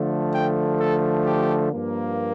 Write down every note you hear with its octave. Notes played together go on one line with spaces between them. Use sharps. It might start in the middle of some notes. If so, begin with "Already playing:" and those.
Already playing: D3 F3 A3
G5
A4
G4
G2 F3 A#3